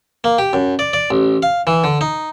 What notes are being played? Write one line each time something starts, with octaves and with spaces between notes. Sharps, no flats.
A#3
G4
F#2
D5
D5
A1
F5
E3
D3
D#4